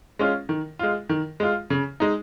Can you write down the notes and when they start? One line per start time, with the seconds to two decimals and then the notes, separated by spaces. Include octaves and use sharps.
0.19 G#3 C#4 F4
0.49 D#3
0.79 G#3 F4
1.09 D#3
1.40 G#3 F4
1.70 C#3
2.00 G#3 D#4